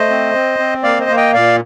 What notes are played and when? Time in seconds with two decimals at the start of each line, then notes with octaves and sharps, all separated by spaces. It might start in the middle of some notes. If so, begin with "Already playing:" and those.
Already playing: A3 C5 D#5
0.10 C4
0.35 C4
0.59 C4
0.83 A#3 D5 F5
1.01 C5 D#5
1.09 A#3
1.17 D#5 G5
1.34 A#2 D5 F5